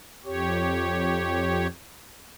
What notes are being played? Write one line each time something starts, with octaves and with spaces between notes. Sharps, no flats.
F2 G4 C#5